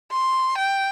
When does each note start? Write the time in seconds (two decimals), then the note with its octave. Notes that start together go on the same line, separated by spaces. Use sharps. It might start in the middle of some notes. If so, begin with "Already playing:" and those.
0.12 C6
0.58 G5